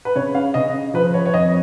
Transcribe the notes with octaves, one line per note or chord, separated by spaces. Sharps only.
B4
C#3 C#5
F5
C#3 D#5
F3 B4
C#5
C#5
F2 D#5